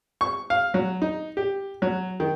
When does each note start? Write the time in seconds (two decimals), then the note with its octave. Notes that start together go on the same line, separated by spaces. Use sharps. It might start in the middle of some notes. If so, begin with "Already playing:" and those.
0.21 C#6
0.50 F5
0.74 F#3
1.02 D#4
1.37 G4
1.82 F#3
2.20 D#3